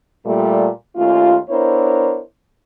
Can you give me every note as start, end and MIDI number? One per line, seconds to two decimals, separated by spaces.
0.25 0.67 46
0.25 0.67 55
0.25 0.67 57
0.96 1.36 39
0.96 1.36 57
0.96 1.36 61
0.96 1.36 65
1.49 2.19 59
1.49 2.19 62
1.49 2.19 64
1.49 2.19 70
1.49 2.19 72
1.49 2.19 73